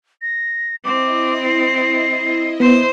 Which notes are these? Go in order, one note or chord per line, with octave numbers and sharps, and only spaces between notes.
A#6
C4 E4 D#5 D6
C7
B3 C5